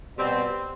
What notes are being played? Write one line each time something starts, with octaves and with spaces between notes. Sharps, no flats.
B2 G3 C4